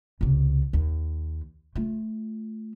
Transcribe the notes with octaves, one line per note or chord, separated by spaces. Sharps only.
C#2 C3
D#2
A3 F4